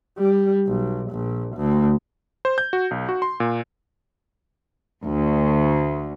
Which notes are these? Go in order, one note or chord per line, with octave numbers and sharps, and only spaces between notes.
G3
B1
A#1
D2
C5
G6
F#4
B1
F#4
C6
A#2
D2